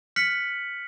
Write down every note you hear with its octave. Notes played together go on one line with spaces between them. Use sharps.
F6 F#6 B6 C#7 F#7